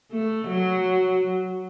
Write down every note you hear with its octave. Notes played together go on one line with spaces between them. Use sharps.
A3
F#3